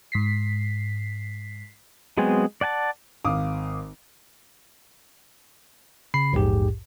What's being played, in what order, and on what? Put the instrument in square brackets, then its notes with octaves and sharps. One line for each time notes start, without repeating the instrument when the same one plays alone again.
[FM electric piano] G#2 B6 C7
[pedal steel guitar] F#3 G#3 B3 C4 G#4
D5 F#5 G#5 A5
[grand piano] G#1 F5 D6 D#6
[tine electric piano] C#3 B5 C7
A#1 E2 G#2 G4 G#4